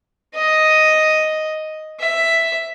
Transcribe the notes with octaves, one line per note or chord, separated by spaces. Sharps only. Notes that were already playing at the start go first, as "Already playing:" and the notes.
D#5
E5